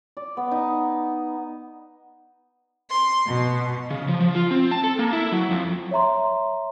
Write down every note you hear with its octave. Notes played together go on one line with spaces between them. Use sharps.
D5
B3
D#4
C6
B2
C#3
F3
F3
F4
C4
A5
A4
A#3
E4
F#3
F2
C#5 E5 A#5 C6